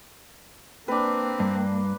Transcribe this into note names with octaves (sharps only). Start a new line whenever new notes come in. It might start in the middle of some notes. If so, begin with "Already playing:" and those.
A#3 C4 D4 B4
G2